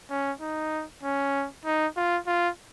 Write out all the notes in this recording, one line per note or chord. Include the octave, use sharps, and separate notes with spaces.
C#4
D#4
C#4
D#4
F4
F4